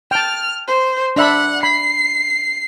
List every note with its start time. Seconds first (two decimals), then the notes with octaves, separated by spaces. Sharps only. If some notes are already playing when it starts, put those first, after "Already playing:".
0.11 G5 A5 F6
0.68 C5
1.16 D4 E5 F#5 B5
1.63 B5 C7